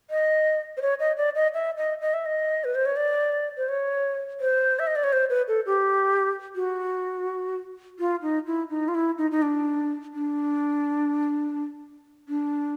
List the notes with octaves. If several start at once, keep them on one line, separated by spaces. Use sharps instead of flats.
D#5
C5
C#5
D#5
D5
D#5
E5
D#5
D#5
E5
D#5
B4
C5
C#5
D5
C5
C#5
C5
E5
D#5
D5
C#5
C5
B4
A4
G4
F#4
F4
D#4
E4
D#4
F4
E4
D#4
D#4
D4
D4
D4